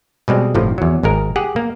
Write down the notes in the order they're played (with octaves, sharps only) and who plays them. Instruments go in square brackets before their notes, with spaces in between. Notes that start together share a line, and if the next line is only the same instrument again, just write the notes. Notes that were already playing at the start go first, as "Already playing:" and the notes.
[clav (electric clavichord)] B2 G3 G#3 C4
G1 A2 C3 F3
E2 F#3
G#1 G#3 A#4
G4 G#4 F#5
A#3